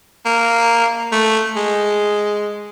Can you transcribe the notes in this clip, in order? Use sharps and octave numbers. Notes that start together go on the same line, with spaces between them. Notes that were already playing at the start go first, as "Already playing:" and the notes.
A#3
A3
G#3